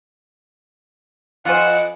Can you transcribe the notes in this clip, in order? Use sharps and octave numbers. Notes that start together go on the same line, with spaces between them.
F2 F4 F#4 C5 F5 F#5 G#5